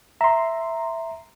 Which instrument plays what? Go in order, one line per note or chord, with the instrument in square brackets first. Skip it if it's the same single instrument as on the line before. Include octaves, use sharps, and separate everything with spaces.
[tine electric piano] E5 [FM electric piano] A#5 C6